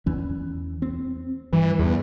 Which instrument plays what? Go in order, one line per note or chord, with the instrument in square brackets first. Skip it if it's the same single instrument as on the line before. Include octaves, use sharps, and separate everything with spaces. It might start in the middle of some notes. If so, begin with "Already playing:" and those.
[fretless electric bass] E2 E3 C#4
C4
[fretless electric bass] G2 [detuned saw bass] E3
[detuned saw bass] E2